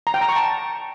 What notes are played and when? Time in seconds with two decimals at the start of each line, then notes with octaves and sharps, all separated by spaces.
0.07 A#5
0.14 G5
0.21 A#5
0.29 C#6
0.36 A5